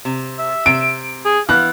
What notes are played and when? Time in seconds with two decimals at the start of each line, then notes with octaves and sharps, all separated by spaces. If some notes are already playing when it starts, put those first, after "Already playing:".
0.05 C3
0.39 E5
0.66 C3 D7
1.26 G#4
1.49 E3 B3 F5 F#6